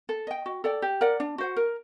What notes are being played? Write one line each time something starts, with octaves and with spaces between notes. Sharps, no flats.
A4
D#5 G5
F#4
A4 D5 G5
G4
A#4 D5 F#5
D4
F#4 C5 F#5
A#4